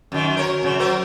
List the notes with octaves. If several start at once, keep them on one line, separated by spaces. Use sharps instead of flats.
F#2 D#3
A#4 C#5
F#2 C#3
F#3 A#4 C5